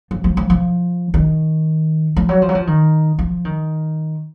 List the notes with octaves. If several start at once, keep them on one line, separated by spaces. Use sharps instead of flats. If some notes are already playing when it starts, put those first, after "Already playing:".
F3
F3
F3
F3
D#3
F3
F#3
F3
F#3
F3
D#3
F3
D#3